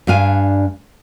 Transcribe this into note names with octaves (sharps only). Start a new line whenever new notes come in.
G2 D4 F5 G#5